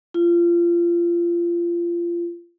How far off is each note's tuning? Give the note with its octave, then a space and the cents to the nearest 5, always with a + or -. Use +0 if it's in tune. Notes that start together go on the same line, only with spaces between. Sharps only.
F4 -25